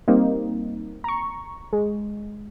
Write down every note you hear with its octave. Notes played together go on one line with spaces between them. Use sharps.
G3 A#3 C4 D#4
A#5 C#6
G#3